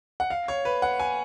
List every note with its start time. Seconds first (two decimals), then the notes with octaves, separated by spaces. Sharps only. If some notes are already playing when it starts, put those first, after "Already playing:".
0.20 F#5
0.30 F5
0.48 C#5
0.65 B4
0.82 F#5
0.99 G#5